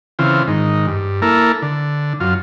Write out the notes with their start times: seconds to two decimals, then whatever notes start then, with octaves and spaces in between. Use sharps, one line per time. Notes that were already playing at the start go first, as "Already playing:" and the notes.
0.19 C#3 E3 C4 F4
0.48 G#2 D#3
0.87 G2
1.22 A#3 E4 A4 A#4
1.62 D3
2.20 F#2 F4